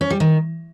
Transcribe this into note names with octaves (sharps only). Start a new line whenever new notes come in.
C#4
G3
D#3